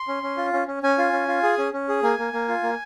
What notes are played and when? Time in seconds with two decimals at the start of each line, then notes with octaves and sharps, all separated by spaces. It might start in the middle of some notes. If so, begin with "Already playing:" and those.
Already playing: C6
0.08 C#4
0.23 C#4
0.37 F4
0.53 C#4
0.68 C#4
0.83 C#4 G#5
0.98 F4
1.13 C#4
1.28 F4
1.43 G#4
1.58 C#4
1.73 C#4
1.88 G#4
2.03 A#3 G#5
2.18 A#3
2.33 A#3
2.48 F4
2.63 A#3